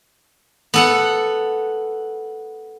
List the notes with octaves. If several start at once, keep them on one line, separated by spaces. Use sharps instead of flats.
B3 A4 F#5